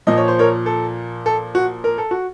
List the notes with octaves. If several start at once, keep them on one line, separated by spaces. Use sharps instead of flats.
A#2 F3 D#5
C#5
C5
A#4 C#5
A4
A4
F#4
A#4
A4
F#4